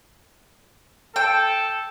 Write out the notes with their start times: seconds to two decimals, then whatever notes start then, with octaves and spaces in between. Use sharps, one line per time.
1.16 A4 G5